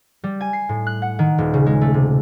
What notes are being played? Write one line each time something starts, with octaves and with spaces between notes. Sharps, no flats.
G3
G#5
C7
A2
F#6
F#5
D#3
D#1
C#3
G#3
A3
C3